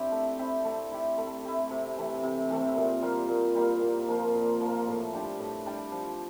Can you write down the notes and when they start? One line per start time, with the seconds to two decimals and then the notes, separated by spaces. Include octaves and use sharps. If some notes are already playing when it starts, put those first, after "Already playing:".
Already playing: C4 D4 E4 G4 A4
0.12 A3
0.39 C4 E4 G4
0.65 A3
0.92 E4 G4
1.18 A3
1.45 E4 G4
1.71 C3
1.97 E3 A3 C4
2.23 C3
2.50 E3 A3 C4
2.76 A#2
3.02 G3 A#3 F4
3.29 A#2
3.55 G3 A#3 F4
3.82 A#2
4.08 F3 A#3 F4
4.34 A#2
4.60 F3 A#3 F4
4.87 A2
5.13 G3 D4 G4
5.39 A2
5.66 G3 D4 G4
5.92 F3